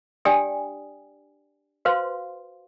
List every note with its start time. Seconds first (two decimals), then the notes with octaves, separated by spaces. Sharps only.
0.25 D4 G4 D5 G5 G#5 D#6
1.85 F#4 B4 C5 F5 C6